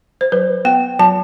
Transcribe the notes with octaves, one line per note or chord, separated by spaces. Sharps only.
C5
F#3 B4
B3 G5
F#3 A5